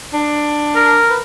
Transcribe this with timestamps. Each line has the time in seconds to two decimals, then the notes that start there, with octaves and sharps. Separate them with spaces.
0.13 D4
0.76 A#4
1.10 B4